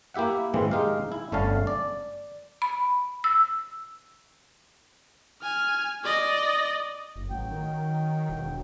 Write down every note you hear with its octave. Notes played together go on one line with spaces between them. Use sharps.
A#3 E4 G4 E5 F#5
G#2 D#3 E3 G#3 C4
G#3 D#4 G4 F5
E4
G1 D3 A3 C#4 F5 A5
D5
B5
E6
G#5 F6
D5 D#5
F#1
A1 F#3 G5
D#3
E1